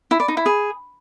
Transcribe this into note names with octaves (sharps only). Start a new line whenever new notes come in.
E4
D5
D#4
E4
G#4